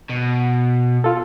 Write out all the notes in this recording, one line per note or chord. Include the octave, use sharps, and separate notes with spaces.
B2
F4 A4